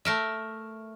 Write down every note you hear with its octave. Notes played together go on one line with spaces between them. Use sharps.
A3 A#4 E5